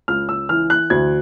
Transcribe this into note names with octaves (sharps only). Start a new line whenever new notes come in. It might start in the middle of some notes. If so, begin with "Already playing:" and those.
C#2 F6
E6
E3 F6
F#6
D2 G#6